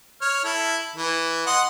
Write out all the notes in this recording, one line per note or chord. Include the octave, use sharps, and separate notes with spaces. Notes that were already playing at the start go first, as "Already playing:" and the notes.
C#5 F6
E4 A4
E3
D#5 F#5 C6